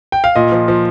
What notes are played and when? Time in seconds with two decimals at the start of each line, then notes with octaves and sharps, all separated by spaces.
0.12 G5
0.24 F5
0.36 A#2 D#5
0.52 F3
0.68 F3